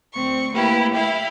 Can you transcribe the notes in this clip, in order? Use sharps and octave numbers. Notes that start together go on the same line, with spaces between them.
D2 C4 C#6
A3 A#3 E4 G4 B4
E4 E5 F5 G5 B5